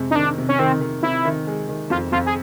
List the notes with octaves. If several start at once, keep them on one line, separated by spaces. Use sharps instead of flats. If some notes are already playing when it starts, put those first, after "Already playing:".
Already playing: F2 C3 G#3
D#4
D#3 D4
C3
C#4
D#3 C4
D#3
C3 E4
D#3
G#3
D#3
F2 F4
F2 F4
G#4